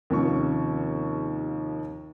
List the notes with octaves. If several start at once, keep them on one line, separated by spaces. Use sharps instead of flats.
D#2 C3 F3 C#4 C#6